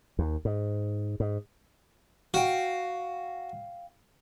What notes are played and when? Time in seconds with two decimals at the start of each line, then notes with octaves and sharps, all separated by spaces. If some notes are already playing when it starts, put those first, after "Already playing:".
0.19 D#2
0.45 G#2
1.20 G#2
2.34 F#4 F5 G5